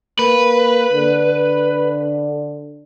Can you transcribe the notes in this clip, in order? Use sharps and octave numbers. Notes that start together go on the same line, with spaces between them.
A#3 B4
D3